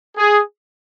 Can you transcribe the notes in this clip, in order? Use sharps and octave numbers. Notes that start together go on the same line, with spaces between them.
G#4